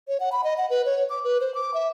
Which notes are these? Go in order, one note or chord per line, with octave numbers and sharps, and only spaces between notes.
C#5
F#5
B5
D#5
F#5
B4
C#5
D6
B4
C5
D6
E5